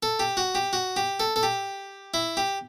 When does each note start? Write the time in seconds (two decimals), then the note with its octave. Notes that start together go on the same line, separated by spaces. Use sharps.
0.03 A4
0.20 G4
0.37 F#4
0.55 G4
0.73 F#4
0.96 G4
1.20 A4
1.36 A4
1.43 G4
2.14 E4
2.37 G4